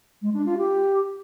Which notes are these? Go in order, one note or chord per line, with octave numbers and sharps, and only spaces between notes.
G#3
D4
F4
G4